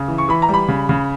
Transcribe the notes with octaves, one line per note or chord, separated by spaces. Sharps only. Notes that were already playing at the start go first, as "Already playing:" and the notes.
Already playing: C#3
E3
C#6
E3 B5
A#5
G3 B5
C#3
C#3